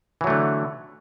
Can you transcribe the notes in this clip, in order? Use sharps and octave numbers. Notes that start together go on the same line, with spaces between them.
D3 E3 F#3 A3